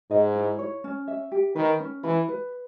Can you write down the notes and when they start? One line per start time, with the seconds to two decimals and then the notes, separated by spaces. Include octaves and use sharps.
0.11 G#2 D#5
0.36 E4
0.59 C#5
0.84 C#4
1.08 E5
1.32 G4
1.56 D#3 B4
1.80 C#4
2.04 E3 B5
2.28 B4